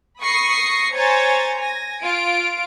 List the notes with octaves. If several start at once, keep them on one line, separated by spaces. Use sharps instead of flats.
B5 C#6 D#6 A#6 C7 C#7
C5 C#5 G#5 A#5 A6
G#5 A#6
F4 D7